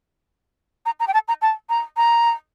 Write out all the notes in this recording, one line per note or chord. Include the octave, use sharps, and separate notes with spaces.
A#5
A#5
G5
A5
A#5
A5
A#5
A#5